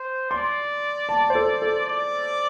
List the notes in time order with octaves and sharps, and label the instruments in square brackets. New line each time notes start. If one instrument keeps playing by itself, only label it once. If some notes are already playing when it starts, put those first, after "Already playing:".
Already playing: [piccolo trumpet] C5
[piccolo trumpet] D5 [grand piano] C6
[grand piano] A5
C5
A4
A4
[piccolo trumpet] D5